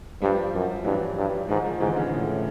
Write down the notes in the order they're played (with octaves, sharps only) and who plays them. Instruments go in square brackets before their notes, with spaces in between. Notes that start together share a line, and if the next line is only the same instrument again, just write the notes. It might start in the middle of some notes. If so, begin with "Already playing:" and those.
[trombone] G2 [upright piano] F3 G3
[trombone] F#2
[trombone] G2 [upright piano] E3 F#3
[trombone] G2
[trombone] G#2 [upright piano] D#3 F3
[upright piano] D#3 F3
[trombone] G#2 [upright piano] D3 E3
[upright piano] C#3
[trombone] A2 [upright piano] D3